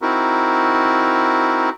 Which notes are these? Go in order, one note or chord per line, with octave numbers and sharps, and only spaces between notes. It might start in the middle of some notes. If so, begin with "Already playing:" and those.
C4 D#4 E4 F#4 A#4